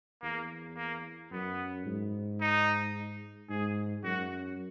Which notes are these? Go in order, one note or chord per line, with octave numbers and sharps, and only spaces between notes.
E2 A#3
A#3
F#2 B3
G#2
D#4
G#2 G#4
F#2 F#4